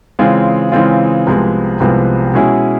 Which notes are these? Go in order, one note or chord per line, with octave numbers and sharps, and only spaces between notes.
C#3 E3 G#3 C4 F4
C#3 E3 G#3 C4 F4
C2 C3 F3 G#3 B3
C2 C3 F3 G#3 B3
B2 G#3 C#4 E4 G#4